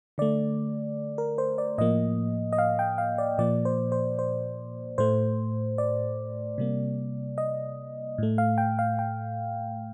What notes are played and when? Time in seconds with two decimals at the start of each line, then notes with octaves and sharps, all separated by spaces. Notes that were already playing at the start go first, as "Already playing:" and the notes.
0.18 D3 A3 D5
1.18 A#4
1.38 C5
1.58 D5
1.78 A2 F3 A#3 D#5
2.53 D#5
2.58 F5
2.79 G5
2.98 F5
3.18 D5
3.38 A#2 F3 A#3 D5
3.65 C5
3.92 C5
4.19 C5
4.98 A2 A3 C5
5.78 D5
6.58 C3 G3 A#3
7.38 D#5
8.18 A2 A3
8.38 F5
8.58 G5
8.79 F5
8.99 G5